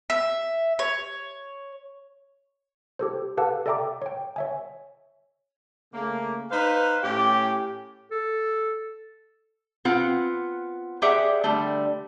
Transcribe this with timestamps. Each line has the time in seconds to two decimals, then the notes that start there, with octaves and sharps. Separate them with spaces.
0.10 E5
0.79 C#5
2.99 G4 A4 C5
3.37 G4 A4 B4 F5 F#5 A5
3.66 A4 D5 E5 G5 A#5 D6
4.02 C#5 G5
4.36 C#5 E5 G#5
5.93 C#3 A3 A#3
6.51 D#4 B4 C5 F5
7.03 A2 C#4 G4
8.11 A4
9.85 B3 C4 F4 F#5
11.02 G4 G#4 C5 D5 E5 F#5
11.44 D3 G3 A3